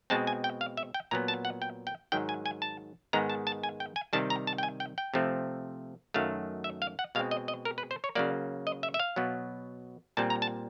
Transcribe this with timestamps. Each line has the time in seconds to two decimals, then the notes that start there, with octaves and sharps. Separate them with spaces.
0.10 B2 G#3 C4 A5
0.27 G#5
0.44 G5
0.61 F5
0.77 E5
0.94 G5
1.11 A#2 F#3 B3 A#5
1.28 A5
1.45 F#5
1.62 G5
1.87 G5
2.12 G#2 D#3 F#3 G5
2.29 G#5
2.46 G#5
2.62 A5
3.13 G#2 D#3 G#3 B3 A#5
3.30 A5
3.47 A5
3.63 G#5
3.80 G5
3.96 G#5
4.13 C3 D#3 G3 A5
4.30 A#5
4.47 A5
4.58 G5
4.63 G#5
4.80 G5
4.98 G5
5.14 C3 F3 A3 C4
6.14 F#2 D#3 F#3 A3 F5
6.64 E5
6.82 F5
6.99 F#5
7.15 B2 G#3 C4 F5
7.31 D#5
7.48 D#5
7.65 A#4
7.78 B4
7.91 C5
8.04 C#5
8.15 C#3 F#3 A#3 D5
8.67 D#5
8.83 E5
8.94 E5
9.00 F5
9.16 B2 F#3 B3
10.17 A#2 G3 C4 A5
10.30 A#5
10.42 A5